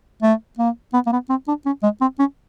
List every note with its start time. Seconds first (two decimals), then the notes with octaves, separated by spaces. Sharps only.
0.22 A3
0.59 A#3
0.93 B3
1.06 A#3
1.12 B3
1.29 C4
1.48 D4
1.66 C#4
1.83 G#3
2.01 C4
2.19 C#4